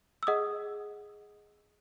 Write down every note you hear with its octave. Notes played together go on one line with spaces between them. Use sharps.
E6
G#4 D#5 F#5 D#6